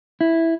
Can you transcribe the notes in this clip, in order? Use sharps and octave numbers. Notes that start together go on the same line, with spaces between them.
E4